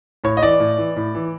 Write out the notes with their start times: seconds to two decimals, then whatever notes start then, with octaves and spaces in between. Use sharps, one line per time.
0.24 A2 C#5
0.37 D#5
0.42 E3 D5
0.60 A2
0.78 E3
0.96 A2
1.15 E3